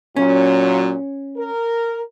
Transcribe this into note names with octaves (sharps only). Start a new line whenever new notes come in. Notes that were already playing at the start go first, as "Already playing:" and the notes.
A#2 F#3 C#4
A#4